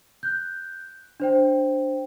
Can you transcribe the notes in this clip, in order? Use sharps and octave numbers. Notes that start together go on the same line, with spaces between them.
F#6 G6
D4 C5 G5